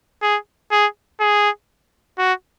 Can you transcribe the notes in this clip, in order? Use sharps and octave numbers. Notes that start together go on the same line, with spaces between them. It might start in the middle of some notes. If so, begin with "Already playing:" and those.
G#4
G#4
G#4
F#4